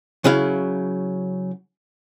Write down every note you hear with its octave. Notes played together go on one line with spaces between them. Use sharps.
C#3 F#3 E4 F5